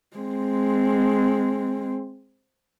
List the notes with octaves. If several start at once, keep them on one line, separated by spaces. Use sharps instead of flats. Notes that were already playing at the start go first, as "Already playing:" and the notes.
G#3 C4